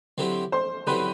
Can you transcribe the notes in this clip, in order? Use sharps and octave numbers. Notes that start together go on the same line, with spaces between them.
D3 F#3 C4 E4 G4
C5 C6
D3 F#3 C4 E4 G4 B4 B5